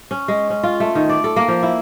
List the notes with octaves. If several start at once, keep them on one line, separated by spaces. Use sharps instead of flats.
C#4
G#3
C#4
F4
A3
D#3
D5
A4
A#3
F3
E4